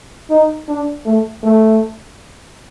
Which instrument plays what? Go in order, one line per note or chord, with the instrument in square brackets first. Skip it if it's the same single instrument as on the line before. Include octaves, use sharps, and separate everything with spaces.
[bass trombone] D#4
D4
A3
A3